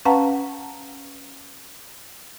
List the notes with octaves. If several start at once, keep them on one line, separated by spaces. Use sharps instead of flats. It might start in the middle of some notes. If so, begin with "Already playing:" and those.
C#4 B4 F5 F#5 A5 A#5